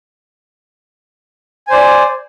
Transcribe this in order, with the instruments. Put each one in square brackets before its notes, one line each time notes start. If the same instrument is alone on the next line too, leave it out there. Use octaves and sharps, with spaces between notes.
[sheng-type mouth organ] G#5
C5
D5